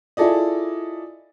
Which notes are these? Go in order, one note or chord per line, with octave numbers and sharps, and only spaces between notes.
E4 F4 G#4 A4 D5 D#5